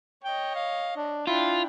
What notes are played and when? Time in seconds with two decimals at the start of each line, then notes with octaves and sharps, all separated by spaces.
0.24 C#5 D#5 G5
0.56 F5
0.96 D4
1.27 D4 E4 F4 G5